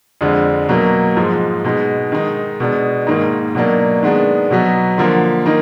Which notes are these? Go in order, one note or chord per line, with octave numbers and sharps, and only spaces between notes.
F2 D3 G#3 D4
B2 F#3 A#3
G#2 F3 G#3 D#4
B2 G#3 D#4
D#3 G#3 D#4
B2 G#3 D4
G#2 D#3 A#3 D#4
B2 F#3 A#3 D4
D#3 G#3 B3 D4
B2 F#3 B3
D3 F3 A#3
D#3 A#3 D#4